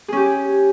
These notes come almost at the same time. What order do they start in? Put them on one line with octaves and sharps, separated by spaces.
G#4 C#4 G4